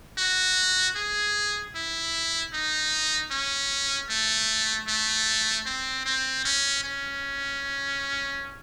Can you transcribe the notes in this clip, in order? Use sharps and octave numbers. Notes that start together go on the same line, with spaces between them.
F#4
G#4
E4
D#4
C#4
A3
A3
C4
C4
C#4
C#4